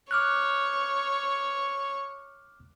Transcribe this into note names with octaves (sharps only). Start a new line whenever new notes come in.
C#5 D6 F6 F#6